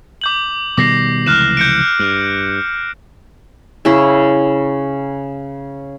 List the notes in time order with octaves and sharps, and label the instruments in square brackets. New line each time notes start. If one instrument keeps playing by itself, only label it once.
[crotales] D6 G6 F#7
[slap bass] B2 D#3 G3 [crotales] D6 A#6 C7
[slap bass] F1 C#2 E3 [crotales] F6 F#6 E7
[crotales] G6 C#7 D7
[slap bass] G2
[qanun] C#3 C#4 E4